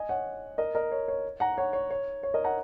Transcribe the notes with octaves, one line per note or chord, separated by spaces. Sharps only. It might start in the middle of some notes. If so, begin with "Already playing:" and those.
Already playing: D#5 G#5
C#5 F#5
A#4 D#5
A#4 D#5
C#5
C#5
F#5 A#5
C#5 F#5
C#5
C#5
C#5
A#4 D#5
F#5 A#5